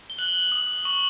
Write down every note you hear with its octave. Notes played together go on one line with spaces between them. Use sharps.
G7
F#6 F#7
D#6
C#6 F#7